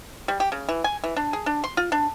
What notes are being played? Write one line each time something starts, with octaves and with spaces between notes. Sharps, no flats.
G3
G4
C#3
E3
G#5
E3
D4
G#4
D4
C6
F4
D4